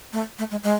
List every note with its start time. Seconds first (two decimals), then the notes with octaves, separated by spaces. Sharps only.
0.13 A3
0.39 A3
0.51 G#3
0.64 G#3